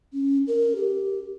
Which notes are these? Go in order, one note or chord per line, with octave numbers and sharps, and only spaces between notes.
C#4
A#4
G4